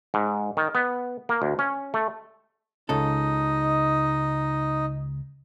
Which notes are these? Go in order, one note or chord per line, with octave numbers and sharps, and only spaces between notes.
G#2
D#3
B3
A#3
D2
C#4
A3
C#2 C#3 D#4 A4 D#5